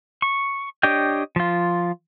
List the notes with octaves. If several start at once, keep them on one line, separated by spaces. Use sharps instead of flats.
C#6
D4 G4 C#5 D#5 G5
F3 F4